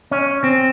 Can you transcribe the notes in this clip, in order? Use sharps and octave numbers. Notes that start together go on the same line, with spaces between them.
C#4
C4